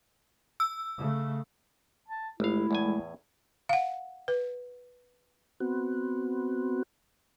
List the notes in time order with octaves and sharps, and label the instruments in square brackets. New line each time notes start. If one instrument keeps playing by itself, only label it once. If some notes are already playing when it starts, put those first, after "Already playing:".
[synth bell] E6
[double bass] C#3 A3
[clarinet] A5
[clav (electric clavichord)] G1 F5 [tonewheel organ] G#3 A3 [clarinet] E4
[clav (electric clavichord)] E2 A2 G#5
[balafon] F5 F#5
B4
[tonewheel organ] B3 C4 F#4